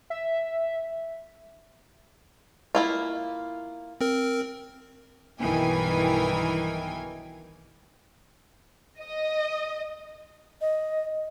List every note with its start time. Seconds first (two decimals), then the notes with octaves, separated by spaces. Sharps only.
0.10 E5
2.75 A#3 E4 F4
4.01 C4 A#4
5.39 B1 G2 D#3 E3 G5 G#5
9.00 D#5
10.61 D#5